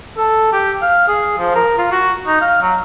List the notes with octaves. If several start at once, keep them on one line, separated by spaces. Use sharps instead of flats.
A4
G4
F5
G#4
F3
A#4
F4
F#4
D#4
F5
F#3